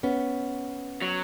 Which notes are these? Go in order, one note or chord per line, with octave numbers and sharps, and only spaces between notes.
B3 C#4
F#3